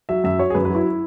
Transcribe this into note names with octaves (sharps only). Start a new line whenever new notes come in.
F#3 E5
F#2 E5
F#3 C#5
G#4
F#2 B4
F#3 B4
E4